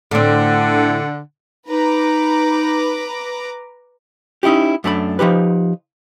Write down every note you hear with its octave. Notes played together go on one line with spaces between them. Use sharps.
A2 D3 C4
D#4 B4 A#5 D6
C#4 D#4 E4 F#4 G4
F#2 A3 D4 B5
F3 D#4 G4 B4